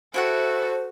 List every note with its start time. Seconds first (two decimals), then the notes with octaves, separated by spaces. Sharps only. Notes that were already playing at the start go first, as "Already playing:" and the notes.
0.14 E4 F#4 A4 C5 E5 F#5